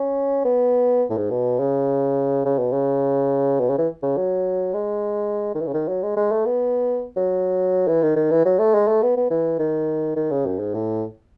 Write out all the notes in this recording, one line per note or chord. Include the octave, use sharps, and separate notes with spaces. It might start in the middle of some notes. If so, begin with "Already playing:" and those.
Already playing: C#4
B3
A2
G#2
B2
C#3
C#3
B2
C#3
B2
C#3
E3
C#3
F#3
G#3
D#3
E3
C#3
D#3
F#3
G#3
G#3
A3
B3
F#3
E3
D#3
D#3
E3
F#3
A3
G#3
A3
B3
B3
E3
D#3
D#3
C#3
F#2
G#2
A2